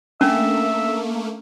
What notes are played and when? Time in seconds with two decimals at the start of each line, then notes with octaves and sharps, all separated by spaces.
0.21 A3 A#3 C#4 D4 E5